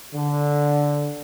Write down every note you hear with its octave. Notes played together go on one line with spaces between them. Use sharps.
D3